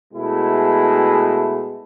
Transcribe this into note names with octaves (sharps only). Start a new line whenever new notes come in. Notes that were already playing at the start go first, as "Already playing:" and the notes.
B2 G#3 A3 E4